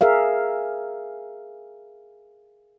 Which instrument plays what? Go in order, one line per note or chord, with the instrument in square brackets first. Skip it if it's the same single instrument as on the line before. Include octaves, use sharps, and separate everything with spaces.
[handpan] G#4 A#4 E5 F5